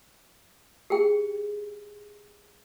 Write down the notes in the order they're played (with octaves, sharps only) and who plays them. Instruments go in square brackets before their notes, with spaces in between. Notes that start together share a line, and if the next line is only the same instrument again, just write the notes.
[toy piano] G4 G#4 G5